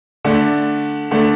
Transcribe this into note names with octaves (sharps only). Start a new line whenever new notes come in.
D3 A3 D4
D3 A3 D4